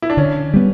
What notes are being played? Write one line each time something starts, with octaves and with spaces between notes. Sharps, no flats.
E4
D4
D3 C#4
G3 B3